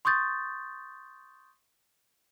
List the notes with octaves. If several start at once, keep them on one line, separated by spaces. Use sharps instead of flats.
C6 C#6 D#6 G6 A6